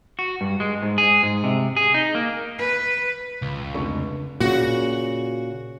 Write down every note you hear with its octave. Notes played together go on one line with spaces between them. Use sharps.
F#4
G2
G#3
G#2
G#4
G#2
C3
G#4
D#4
A#3
B4
C#2
F1 D3 C#6
A#2 C#3 F#4